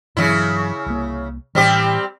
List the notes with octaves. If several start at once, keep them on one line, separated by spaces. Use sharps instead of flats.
G2 C#3 E3 F#3 E4
C2 A#3
A2 E3 G3 C4 G4